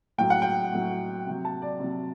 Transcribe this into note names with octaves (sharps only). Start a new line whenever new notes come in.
A2 F#3 G5
F#5
G5
A2 F#3
C3 F#3
A5
D5
C3 F#3